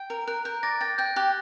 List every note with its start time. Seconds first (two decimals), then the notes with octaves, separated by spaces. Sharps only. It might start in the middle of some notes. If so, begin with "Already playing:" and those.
Already playing: G5
0.10 A#4
0.27 A#4 F#6
0.45 A#4 G6
0.63 D5 A#6
0.81 G5 A6
0.98 G5 G6
1.16 G4 F#6